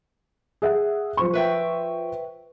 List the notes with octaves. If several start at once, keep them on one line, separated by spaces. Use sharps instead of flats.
G#4 E5 F#5
F3 C5 C#6
B4 E5 G5